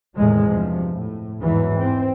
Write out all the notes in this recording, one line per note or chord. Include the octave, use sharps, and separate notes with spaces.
E2 A2 C3 D#3 G#3
G2 C3 F3
A2
E2 G#2 E3 F#3
C4